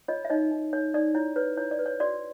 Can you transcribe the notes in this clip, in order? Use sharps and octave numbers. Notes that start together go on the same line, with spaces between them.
F4 C#5 D#5
E5
D#4 C#5 D#5
D#4
D#4 C#5
D#4 D5
E4 C#5
B4 C#5
E4 C#5
D5
B4
C#5
F#4 D5